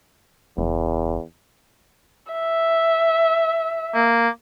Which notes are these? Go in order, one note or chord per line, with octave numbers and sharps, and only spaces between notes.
F#1 E2
E5
A#3